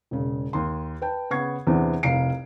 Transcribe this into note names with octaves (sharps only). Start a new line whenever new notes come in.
E1 C#3
D#2 C6
B4 G5 A5
C#3 B3 C#6 G#6 C7
E2 C3 E3 B3 C4 D4
F1 C2 C3 F5 C7 D7